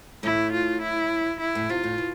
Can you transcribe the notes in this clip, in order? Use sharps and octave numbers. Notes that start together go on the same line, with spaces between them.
A2 A3 E4
F4
E4
E4
A2
C3 F4
A2
B2